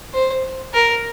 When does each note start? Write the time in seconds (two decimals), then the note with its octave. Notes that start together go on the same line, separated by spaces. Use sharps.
0.14 C5
0.74 A#4